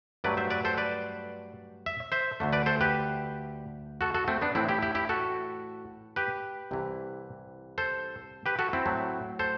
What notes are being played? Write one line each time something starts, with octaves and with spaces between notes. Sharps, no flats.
G2 F#3 A3 B4 D5
C5 E5
B4 D5
A4 C5
B4 D5
E5
C5 E5
D2 D3 A3
B4 D5
A4 C5
G4 B4
F#4 A4
F#4 A4
A3 C4
B3 D4
A2 E3 A3 C4 E4
E4 G4
E4 G4
E4 G4
F#4 A4
G4 B4
C2 C3 E3
A4 C5
G4 B4
F#4 A4
C4 E4
A2 F#3 A3
A4 C5